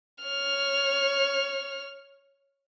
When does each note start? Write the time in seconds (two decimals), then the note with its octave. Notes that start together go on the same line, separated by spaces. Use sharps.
0.24 C#5 F6